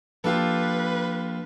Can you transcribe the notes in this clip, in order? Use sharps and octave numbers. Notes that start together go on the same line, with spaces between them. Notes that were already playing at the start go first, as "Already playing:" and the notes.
F3 A#3 D4 F4 G4 A4 B4